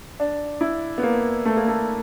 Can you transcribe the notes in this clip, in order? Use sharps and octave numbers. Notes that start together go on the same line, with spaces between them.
D4
E4
B3
A#3
A3
A#3
A3